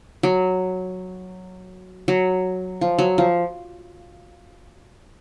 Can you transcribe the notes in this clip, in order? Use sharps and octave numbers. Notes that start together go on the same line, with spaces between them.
F#3
F#3
F3
F#3
F3